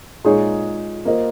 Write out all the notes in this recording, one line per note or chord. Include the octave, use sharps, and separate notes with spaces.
A#2 G#3 D#4 G#4 C#5
A#3 F4 C5 D#5